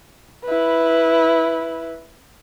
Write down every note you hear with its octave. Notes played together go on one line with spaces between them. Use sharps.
E4 B4